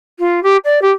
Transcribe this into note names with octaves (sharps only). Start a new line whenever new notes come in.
F4
G4
D5
G4